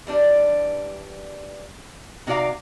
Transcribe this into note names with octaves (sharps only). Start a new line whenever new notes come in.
E3 G3 D4
C3 D#4 F#4 D5 F5 A#5